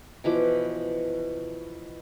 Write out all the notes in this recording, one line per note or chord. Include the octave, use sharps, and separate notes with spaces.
B2 E3 F3 D6